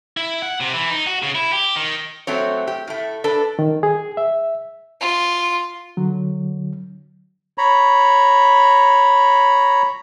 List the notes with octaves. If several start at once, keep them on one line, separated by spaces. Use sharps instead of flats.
E4
F#5
C3
E3
D#4
F#4
C#3
E4
G4
D#3
F#3 A3 C4 C#5
G4
A2 A3
D4 A4 B4
D#3
G#4
E5
F4
D3 F#3
C#5 A#5 B5